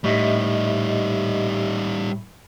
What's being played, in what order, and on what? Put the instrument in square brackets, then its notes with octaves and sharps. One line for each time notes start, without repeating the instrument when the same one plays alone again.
[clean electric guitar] A2 [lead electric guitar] G3 D#4 [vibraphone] G4 D#5 E5